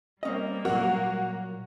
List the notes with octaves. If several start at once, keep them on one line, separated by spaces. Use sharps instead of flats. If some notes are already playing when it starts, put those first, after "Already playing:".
G3 A#3 C4 C#4 D#5
A#2 F#3 F#4